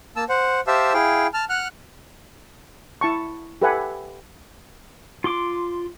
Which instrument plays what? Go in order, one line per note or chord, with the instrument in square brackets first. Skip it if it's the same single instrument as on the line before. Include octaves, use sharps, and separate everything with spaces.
[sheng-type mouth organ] A#3 A5 E6
C5 F#5
G4 C5 E5 F5 A5 E6
E4 G#4 F5 G5
A5 F6
F#5 F6 F#6
[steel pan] E4 A5 C#6
G4 A4 B4 E5 F#5 G#5
[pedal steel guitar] F4 C6 D6